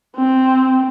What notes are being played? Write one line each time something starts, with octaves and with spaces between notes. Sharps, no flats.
C4